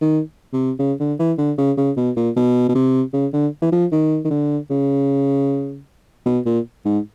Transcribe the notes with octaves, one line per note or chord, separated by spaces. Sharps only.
D#3
C3
C#3
D3
E3
D3
C#3
C#3
B2
A#2
B2
B2
C3
C#3
D3
E3
F3
D#3
D#3
D3
C#3
B2
A#2
G#2